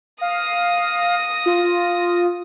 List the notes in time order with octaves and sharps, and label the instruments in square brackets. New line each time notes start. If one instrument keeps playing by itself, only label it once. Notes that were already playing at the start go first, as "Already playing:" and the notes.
[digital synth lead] F5 [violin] D#6 A#6
[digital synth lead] F4